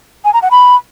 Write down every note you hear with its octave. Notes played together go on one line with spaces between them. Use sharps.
G#5
A#5
F#5
B5